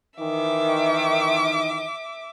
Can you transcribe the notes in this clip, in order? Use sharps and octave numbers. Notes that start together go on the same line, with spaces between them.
D#3 E3 E5 D6